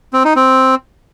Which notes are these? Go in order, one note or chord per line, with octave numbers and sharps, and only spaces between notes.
C4
D#4
C4